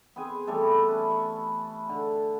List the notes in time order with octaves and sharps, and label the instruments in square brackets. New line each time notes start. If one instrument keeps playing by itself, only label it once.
[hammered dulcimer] B3 C4 G#4 G#5
E3 G3 A3 A4
C#4 B4
C#6
D3